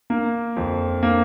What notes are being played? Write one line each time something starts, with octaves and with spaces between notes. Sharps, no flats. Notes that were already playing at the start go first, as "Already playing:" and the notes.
A#3
F2
A#3